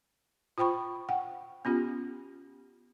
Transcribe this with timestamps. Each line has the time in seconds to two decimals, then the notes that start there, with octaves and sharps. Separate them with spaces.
0.58 F4 C5 G5 B5 C#6
1.09 F#5 G5
1.65 B3 C#4 F4 G4